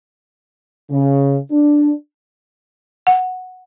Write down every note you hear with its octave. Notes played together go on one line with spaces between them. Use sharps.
C#3
D4
F#5